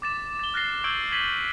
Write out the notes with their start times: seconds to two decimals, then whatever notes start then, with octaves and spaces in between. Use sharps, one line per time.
0.02 D6 A6 E7
0.39 A6 G7
0.54 F6 F#6 A6 A#6 C7 G7
0.84 C#6 E6 G6 G#6 D7 F#7
1.12 G#6 A6 B6 D#7 F#7